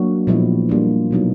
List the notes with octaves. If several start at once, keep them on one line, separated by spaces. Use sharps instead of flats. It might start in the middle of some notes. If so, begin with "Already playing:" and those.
Already playing: F#3 A#3 D4 F#4
A#2 F3 G#3 B3 E4
G3 A#3 D4 F4
B2 F#3 B3 D#4